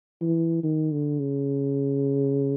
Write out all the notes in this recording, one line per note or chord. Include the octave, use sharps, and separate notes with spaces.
E3
D#3
D3
C#3